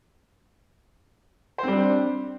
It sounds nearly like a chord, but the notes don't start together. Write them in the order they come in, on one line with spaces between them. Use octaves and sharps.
C5 C4 G3 D4